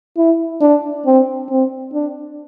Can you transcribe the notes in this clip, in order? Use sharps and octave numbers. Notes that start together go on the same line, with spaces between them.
E4
D4
C4
C4
D4